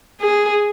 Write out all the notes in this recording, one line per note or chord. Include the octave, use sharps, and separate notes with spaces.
G#4